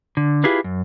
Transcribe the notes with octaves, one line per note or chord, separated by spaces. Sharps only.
D3
E4 F4 G4 G#4 B4
F#2